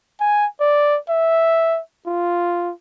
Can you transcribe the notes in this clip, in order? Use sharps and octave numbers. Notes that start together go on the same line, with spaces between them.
G#5
D5
E5
F4